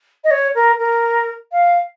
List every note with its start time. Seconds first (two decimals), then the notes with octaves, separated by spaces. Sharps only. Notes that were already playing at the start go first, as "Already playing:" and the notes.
0.24 D#5
0.30 C#5
0.54 A#4
0.78 A#4
1.52 F5